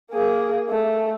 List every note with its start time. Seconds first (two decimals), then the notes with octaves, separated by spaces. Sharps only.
0.11 A#3 G#4
0.69 A3